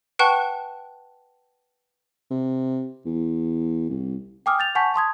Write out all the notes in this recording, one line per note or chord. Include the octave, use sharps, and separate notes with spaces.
B4 F#5 G5 A5 C#6 F#6
C3
E2
C2
G5 G#5 D6 D#6 F6
G6 A6 F7
F#5 G#5 A5 C#6 G6 B6
A5 C6 D#6 G#6